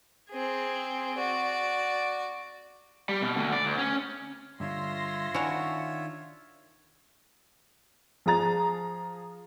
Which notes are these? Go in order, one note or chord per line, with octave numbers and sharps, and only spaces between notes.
C4 G#4
F#4 D5
G3
B2
D2
D5
D2
C#4
G2 D3 F4 C#5 E5 C6 A#6
D#3 C#4 D4 E4 F#4
F3 G#4 A#5 A6